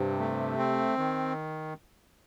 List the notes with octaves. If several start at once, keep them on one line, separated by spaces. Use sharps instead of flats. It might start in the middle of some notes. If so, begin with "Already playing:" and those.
Already playing: G2 C3
A3
C4
D#3